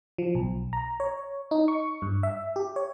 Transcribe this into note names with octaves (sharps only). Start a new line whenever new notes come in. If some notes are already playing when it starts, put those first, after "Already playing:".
F3
B1
A#5
C#5
D#4
C#6
G2
E5
G4
C#5